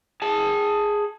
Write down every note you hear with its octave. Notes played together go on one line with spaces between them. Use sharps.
G#4 A5